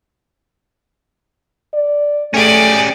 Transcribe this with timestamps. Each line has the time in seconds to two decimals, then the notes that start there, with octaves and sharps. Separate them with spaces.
1.74 D5
2.34 A3 C#4 G4 G#4 D5